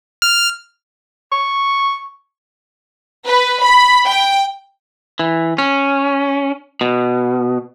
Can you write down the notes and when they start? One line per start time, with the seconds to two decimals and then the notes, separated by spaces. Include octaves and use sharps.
0.22 F6
1.32 C#6
3.26 B4
3.62 B5
4.06 G5
5.19 E3
5.58 C#4
6.81 B2